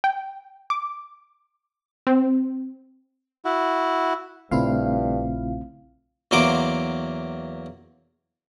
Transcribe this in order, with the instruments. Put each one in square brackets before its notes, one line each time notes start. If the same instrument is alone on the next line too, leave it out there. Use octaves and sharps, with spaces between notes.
[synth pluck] G5
D6
C4
[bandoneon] E4 F#4
[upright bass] A#1 [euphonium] G2 [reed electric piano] C#3 A3 C4 [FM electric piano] E4 F4 F5
[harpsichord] E2 F#3 A#3 C5 D6